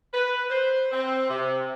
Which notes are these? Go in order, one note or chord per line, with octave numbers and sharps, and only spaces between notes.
B4
C5
C4
C3